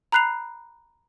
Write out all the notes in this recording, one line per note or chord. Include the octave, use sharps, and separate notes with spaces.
A#5 B5 F#6 C7 F7